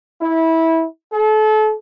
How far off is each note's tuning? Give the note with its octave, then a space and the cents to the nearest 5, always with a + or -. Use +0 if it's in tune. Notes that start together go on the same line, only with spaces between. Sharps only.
E4 -20
A4 -35